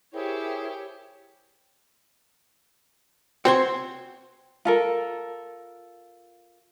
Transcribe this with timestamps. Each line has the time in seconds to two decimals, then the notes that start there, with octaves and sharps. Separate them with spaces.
0.13 E4 G4 G#4 A#4 C5 C#5 G5
3.45 C4 F#4 C5 G#5
4.65 F4 A4 A#4